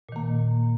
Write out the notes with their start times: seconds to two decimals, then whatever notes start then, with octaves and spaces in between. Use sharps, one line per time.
0.09 A#2
0.12 D#3
0.16 A#3